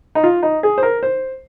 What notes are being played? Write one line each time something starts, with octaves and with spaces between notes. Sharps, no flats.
D#4
F4
D#4
G#4
C5
A#4
C5